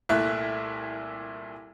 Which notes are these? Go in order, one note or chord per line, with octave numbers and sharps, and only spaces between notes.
C2 A#2 A3 E4 E5 F#6